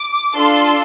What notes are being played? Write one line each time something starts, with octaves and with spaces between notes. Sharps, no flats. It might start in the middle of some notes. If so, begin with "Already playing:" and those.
Already playing: D6
D4 F4 A4 C6